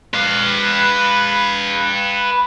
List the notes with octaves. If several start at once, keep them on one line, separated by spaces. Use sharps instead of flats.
B4 F5